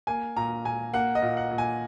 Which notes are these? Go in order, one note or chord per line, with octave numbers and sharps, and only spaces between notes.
A#3 G#5
A#2 A#5
A#2 G#5
A#3 F#5
D#5
A#2
F#5
A#2
G#5